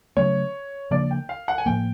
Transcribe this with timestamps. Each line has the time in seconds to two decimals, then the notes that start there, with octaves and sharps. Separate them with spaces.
0.17 C#3 F#3 A3 C#4 C#5
0.91 C#3 F3 A#3 D4 D5
1.11 G5
1.29 F5
1.48 F#5
1.58 G#5
1.66 A2 F3 A#3 G5